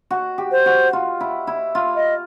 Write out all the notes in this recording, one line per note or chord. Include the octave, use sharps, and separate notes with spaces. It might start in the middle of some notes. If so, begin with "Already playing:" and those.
F#4
G4
C5
F#4
F4
E4
E4
F4
D#5